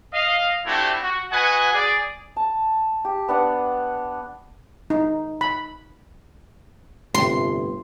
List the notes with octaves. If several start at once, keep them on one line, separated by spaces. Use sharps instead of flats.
D#5 F5
A3 C4 D4 E4 F#4 G4
F#4
F#4 B4 D#5 F#5 G#5
G#4 D5
A5
G4
B3 D4 F#5
D#4
B5
G1 A2 C3 C6